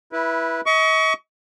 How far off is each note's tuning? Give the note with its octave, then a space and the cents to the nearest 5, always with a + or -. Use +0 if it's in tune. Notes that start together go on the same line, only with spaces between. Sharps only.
E4 +0 B4 -20
D#5 +40 C#6 +25